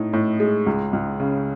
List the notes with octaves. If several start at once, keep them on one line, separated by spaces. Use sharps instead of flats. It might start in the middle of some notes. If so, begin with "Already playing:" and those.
Already playing: A2 D#4
A2
G#3
C#2
C#2
C#3